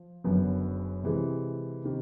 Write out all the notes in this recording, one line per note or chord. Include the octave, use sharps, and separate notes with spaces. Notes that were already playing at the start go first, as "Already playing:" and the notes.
Already playing: F3
F#1 F#2 D3 F#3 B3
C3 E3 G#3
C3 D#3